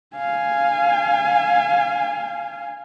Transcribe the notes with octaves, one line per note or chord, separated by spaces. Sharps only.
F5 G#5